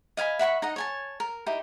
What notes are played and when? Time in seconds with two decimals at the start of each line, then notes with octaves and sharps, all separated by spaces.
0.17 D#5 F5 G#5 B5
0.39 E5 F#5 B5 C#6
0.62 D#4 D#5 F#5
0.76 C#5 G#5 A5
1.20 A#4
1.46 D#4 E4 G4